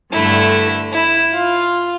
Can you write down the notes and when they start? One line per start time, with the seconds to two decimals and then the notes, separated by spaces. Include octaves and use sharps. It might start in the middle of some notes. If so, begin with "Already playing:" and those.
0.12 G2 D3 A3 E4
0.93 E4
1.34 F4